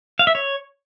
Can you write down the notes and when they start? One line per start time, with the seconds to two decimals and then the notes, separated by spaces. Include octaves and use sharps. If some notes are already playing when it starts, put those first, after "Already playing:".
0.19 F5
0.27 E5
0.35 C#5